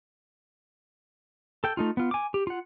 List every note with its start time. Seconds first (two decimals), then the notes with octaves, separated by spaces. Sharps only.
1.64 A4 G5
1.77 A3 D#4 F4
1.97 B3 F4
2.11 G#5 D6
2.34 G4
2.47 F4 F#5